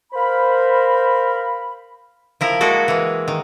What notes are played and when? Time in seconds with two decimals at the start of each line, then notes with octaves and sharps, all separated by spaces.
0.13 A#4 C5 F5 B5
2.41 F3 E4 A#4
2.61 G#3 A#3 F#4 A4
2.88 E3 G#3
3.28 D#3